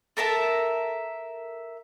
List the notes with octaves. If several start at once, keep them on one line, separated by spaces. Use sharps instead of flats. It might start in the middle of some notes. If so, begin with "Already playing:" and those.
A4 A#4 E5 A5